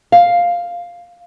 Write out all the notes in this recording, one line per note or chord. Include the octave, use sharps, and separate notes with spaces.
F5